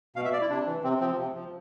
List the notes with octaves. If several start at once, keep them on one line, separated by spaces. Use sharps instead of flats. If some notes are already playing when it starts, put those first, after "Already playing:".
B2 F5
E5
D5
E4
C3 D4
E3
C3 C4
F3 C4
C3
F3